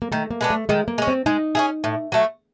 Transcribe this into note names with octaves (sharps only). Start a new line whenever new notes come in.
A#3
D#3 A3
A#3
G#3 B3 D4
A3
D#3 G#3
A#3
G#3 C#4
C4
G#3 D#4
C#4 E4 G#4
A2
F#3 A3